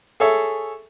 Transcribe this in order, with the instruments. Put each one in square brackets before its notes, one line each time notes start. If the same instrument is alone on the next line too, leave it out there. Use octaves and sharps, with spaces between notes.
[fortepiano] G#4 A4 C#5 E5